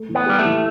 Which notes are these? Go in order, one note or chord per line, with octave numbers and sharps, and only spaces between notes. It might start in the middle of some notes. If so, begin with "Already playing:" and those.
Already playing: A3
E3
B3
G3 G4
A3
E3